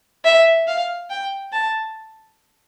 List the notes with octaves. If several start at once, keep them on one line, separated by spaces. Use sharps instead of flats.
E5
F5
G5
A5